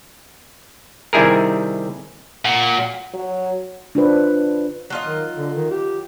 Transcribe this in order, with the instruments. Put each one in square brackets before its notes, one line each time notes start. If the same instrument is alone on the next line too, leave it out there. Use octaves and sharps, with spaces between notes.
[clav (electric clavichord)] C3 D#3 G3 E4 G#4 A#4
[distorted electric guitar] A#2 [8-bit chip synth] F#5
[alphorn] F#3
[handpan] D4 F4 B4 C5
[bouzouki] F#3 F4 D#5
[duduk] D#3
D3
D#3
G4